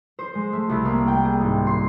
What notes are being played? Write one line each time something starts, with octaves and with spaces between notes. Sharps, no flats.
C5
G#3
A3
C2
A#3
G5
G#4
G#1
C6